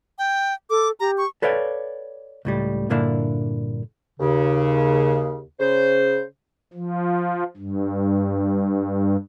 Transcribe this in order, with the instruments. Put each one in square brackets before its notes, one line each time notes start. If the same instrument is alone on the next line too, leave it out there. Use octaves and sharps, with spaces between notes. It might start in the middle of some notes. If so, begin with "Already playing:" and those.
[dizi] G5
[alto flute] A4 [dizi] D6
[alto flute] G4 [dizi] A#5
[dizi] C#6
[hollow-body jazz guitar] A4 B4 C#5 D5 F5 G5
C#2 A2 G3
G2 A#2 D3 A#3 D4 E4
[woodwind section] D#2 C#3
C#3 C5
[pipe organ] F3
G2